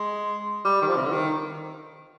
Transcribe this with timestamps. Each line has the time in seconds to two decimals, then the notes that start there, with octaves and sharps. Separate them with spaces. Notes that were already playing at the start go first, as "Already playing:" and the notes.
Already playing: G#3
0.65 G3
0.82 D#3
0.87 F3
0.97 C3
1.05 D3
1.12 D#3